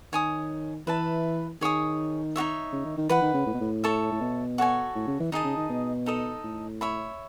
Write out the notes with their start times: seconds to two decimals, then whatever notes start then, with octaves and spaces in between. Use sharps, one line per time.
0.13 D#3 C#5 G#5 D#6
0.87 E3 B4 E5 A5
1.61 D#3 G#4 C#5 G#5 D#6
2.36 D#4 F#4 C#5 E5
2.73 C#3
2.85 D#3
2.97 D#3
3.09 E3 B4 F#5 B5
3.22 D#3
3.34 C#3
3.46 A2
3.54 B2
3.60 A2
3.84 A4 C#5 E5 A5
4.12 A2
4.21 B2
4.58 F#4 A4 C#5 G#5
4.95 A2
5.07 C#3
5.20 E3
5.32 D#3 D#4 G#4 D#5 A5
5.44 C#3
5.57 D#3
5.70 B2
6.06 D#4 A4 D#5
6.44 A2
6.81 C#5 E5 B5